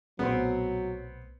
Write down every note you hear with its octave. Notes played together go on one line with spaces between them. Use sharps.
B1 A#2 F#3 A3 B3 C4